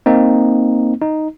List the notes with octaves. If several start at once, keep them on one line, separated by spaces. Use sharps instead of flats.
A#3 C4 D#4
D#4